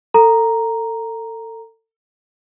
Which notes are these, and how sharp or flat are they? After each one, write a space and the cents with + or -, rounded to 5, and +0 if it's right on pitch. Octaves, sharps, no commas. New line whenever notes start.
A4 +30 A#5 +0